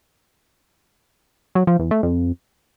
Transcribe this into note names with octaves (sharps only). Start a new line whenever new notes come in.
F#3
F3
E2
A3
F2